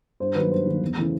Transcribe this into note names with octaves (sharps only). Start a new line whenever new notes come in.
G2 C5
D#3 F#3 A#3 B4
G2 C5
D#3 F#3 A#3
E2
C#3 E3 A3